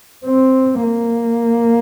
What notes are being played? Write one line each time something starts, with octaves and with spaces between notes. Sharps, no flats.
C4
A#3